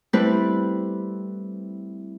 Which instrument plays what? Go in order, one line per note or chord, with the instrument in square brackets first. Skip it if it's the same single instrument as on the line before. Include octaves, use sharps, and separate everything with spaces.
[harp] G3 A3 C4 E4 B4